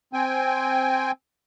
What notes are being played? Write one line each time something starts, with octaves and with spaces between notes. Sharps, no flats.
C4 G5 G#5